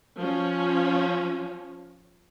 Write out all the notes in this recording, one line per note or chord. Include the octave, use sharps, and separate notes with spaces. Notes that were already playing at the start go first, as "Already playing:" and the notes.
F3 C#4